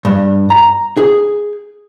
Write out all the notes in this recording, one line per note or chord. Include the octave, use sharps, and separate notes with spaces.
G2
A#5
G#4